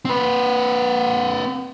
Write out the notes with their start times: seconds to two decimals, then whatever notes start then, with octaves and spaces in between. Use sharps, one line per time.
0.05 C4 B4